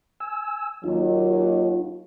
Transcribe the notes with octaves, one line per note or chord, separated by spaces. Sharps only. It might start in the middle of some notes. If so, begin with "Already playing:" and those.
G#5 E6
D#2 F#3 D#4 F4